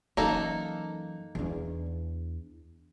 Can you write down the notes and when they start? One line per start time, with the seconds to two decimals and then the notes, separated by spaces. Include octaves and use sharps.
0.17 F#2 E3 A#3 D#4 A4
1.35 E2 D4